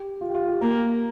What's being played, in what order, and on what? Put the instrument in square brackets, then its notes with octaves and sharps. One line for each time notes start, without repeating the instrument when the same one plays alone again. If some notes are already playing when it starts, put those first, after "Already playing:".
Already playing: [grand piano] G4
F4
G4
F4
G4
[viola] A#3 [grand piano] A#4